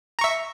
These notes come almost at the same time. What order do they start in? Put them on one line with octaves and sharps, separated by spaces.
A#5 C#6 E5